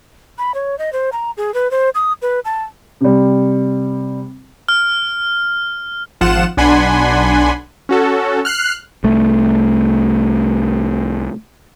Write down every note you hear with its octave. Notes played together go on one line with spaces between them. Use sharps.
B5
C#5
D#5
C5
A#5
G#4
B4
C5
D#6
B4
A5
C3 G3
F6
G#1 F3 F4 F#5 E7
B1 D4 F#5 G#5 B5 C6
C#4 F#4 A4
F6 F#6 C7
C2 A3